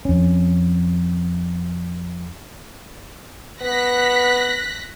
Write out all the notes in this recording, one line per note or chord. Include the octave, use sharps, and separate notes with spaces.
F2 C#4
B3 F#6 A#6 B6